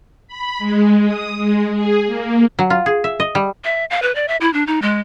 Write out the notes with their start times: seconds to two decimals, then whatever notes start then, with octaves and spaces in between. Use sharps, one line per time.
0.28 B5
0.59 G#3
1.07 D#6
1.38 G#3
1.72 G#4
2.06 A#3
2.59 F#3
2.70 F4
2.86 G#4
3.04 E5
3.20 D#5
3.35 G3
3.64 E5
3.90 F5
4.02 B4
4.15 D5
4.28 E5
4.41 E4
4.53 D4
4.67 D#4
4.82 G#3